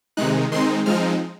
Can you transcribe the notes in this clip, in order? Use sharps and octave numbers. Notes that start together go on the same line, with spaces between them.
C3 D#3 G#3 D#4 F#6
D#3 G#3 C4 D#4 C6
F3 G#3 C4 D#4 F6